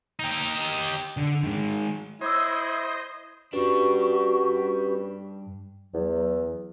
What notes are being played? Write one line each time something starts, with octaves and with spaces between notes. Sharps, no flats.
D#4 G4
D3
D#3 G#3
E4 C5 C#5 D#5 D6 E6 G#6
G2 C#4 D4 F#4 G4 B4
E2 F#3